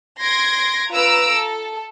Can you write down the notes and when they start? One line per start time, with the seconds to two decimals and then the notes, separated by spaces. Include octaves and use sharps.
0.19 C6 G#6 A#6 D7
0.90 F4 B4 A#5 E6 D7
1.32 A4